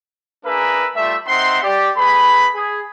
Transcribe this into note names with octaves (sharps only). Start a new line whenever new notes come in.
A#3 D4 G#4 A#4 B4 E5
G3 A3 F4 E5
C4 D#4 E5 F#5 C6
G4 D5
A3 G#4 B4 B5
G#4